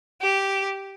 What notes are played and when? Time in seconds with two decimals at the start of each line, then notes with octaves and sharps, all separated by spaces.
0.22 G4